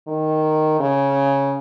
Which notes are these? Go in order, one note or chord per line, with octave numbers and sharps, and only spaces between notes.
D#3
C#3